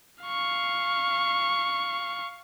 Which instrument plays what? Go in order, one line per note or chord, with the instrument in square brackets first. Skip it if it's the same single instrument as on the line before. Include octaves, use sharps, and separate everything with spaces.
[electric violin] F5 C#6